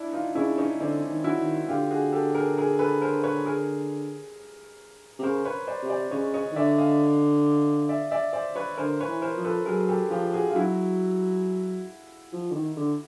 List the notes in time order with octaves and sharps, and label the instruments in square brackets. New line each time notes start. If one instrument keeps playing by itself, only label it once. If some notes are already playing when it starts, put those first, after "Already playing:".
Already playing: [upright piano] D4 E4
D#4 F4
[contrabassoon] C#3 [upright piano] D4 E4
[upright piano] C#4 D#4
[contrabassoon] D3 [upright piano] C4 D4
[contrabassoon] D#3
[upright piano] E4 F#4
[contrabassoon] D#3
[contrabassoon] D3 [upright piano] F4 G4
[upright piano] F#4 G#4
G4 A4
G#4 A#4
G#4 A#4
A4 B4
A#4 C5
B4 C#5
G#4 A#4
[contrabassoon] C3
[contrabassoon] C#3 [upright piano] A#4 C5
[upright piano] B4 C#5
C5 D5
[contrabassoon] C3
[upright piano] C5 D5
[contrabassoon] C#3 [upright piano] C#5 D#5
[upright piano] C#5 D#5
[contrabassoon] D#3
[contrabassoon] D3 [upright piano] D5 E5
[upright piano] D#5 F5
D5 E5
D5 E5
C5 D5
B4 C#5
[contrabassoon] D3 [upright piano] A#4 C5
[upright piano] B4 C#5
[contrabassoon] E3
[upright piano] A#4 C5
[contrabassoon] F3
[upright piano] A4 B4
[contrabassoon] F#3 [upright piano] G#4 A#4
[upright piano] G4 A4
[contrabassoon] F3 [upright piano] F4 G4
[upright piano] F#4 G#4
F4
[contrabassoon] F#3 [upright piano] E4 F#4
[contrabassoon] F3
D3
D#3
D3